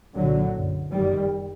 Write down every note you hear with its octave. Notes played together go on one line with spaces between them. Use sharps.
C2 A#2 D3 F#3
F#1 F#2
F#1 F#2 D#3 G3